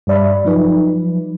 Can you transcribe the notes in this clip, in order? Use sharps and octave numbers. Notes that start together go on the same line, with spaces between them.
G2 G3 D5 E5 B5
F3 F#3 D#4 B4